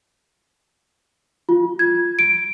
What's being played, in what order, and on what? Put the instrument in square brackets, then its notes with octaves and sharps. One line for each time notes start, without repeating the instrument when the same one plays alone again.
[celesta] F4
G#6
D7